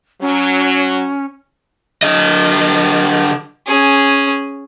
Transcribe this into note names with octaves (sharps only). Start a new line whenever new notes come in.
F#3 C#4
D3 D#5
C#4 G#4